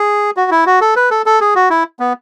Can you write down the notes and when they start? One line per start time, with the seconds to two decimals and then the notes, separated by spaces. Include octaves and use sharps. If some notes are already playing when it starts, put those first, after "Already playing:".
Already playing: G#4
0.37 F#4
0.51 E4
0.66 F#4
0.81 A4
0.96 B4
1.11 A4
1.26 A4
1.41 G#4
1.55 F#4
1.70 E4
2.00 B3